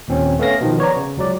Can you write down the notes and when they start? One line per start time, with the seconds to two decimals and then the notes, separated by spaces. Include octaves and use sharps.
0.08 D#2 A#2 C4 C#4
0.39 A3 B3 C#4 F5 A#6
0.61 B2 D#3 F3
0.78 B3 C#5 D5 A#5
0.96 C#3
1.17 C#2 F#3 D5